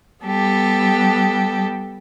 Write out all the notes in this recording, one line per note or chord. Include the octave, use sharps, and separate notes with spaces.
G3 B3 G4 A4